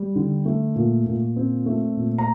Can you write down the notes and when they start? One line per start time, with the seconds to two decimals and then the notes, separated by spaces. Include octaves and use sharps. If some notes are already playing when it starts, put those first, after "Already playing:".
Already playing: G3
0.16 D3
0.45 A3
0.76 A#2
1.06 A#2
1.36 C4
1.66 A3
1.96 A#2
2.18 A#5